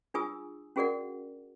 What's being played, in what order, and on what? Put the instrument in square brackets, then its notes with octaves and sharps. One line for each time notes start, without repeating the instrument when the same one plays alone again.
[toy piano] D4 F4 G#4 G#5 D#6 E6
C#4 F#4 G#4 A#4 D5 F#5